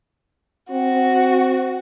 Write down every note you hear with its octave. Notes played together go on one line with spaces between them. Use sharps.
C4 F#4